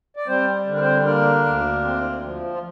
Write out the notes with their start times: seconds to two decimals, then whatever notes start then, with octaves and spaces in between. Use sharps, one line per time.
0.16 D5
0.28 G3 C4 C5
0.66 D3
0.75 A#4
0.80 C4 C5
1.06 A#3 D4 A#4
1.45 D2
1.84 C4
2.23 F3
2.54 F4